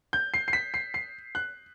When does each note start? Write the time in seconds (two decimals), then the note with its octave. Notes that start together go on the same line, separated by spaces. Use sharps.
0.13 G6
0.34 C7
0.48 C7
0.53 B6
0.74 C7
0.94 C7
1.35 F#6